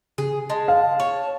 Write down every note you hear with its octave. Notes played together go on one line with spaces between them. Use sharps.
C#3 G#4
G#3 A5
F5
C#5